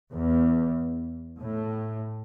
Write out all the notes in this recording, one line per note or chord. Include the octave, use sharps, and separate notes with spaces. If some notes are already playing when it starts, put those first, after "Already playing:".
E2
A2